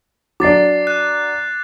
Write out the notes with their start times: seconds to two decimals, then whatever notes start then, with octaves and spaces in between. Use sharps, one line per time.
0.40 F#3 D4 D6 A6 C7
0.87 F#6